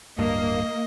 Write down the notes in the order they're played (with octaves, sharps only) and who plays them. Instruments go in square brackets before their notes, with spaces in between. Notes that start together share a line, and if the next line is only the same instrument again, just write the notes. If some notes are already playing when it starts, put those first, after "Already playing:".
[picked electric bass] D1 G2 [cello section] A#3 [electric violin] D#5